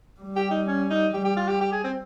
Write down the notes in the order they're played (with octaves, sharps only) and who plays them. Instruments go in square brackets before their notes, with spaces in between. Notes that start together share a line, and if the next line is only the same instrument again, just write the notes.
[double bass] G3
[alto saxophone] G4
D#4
C#4
D#4
[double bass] G3 [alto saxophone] G4
[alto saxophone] G4
F4
G4
G4
G#4
C4